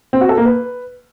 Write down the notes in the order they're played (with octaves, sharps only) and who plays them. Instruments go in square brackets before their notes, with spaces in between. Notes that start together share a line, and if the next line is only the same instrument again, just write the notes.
[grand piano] C4
F#4
A4
A#3
B4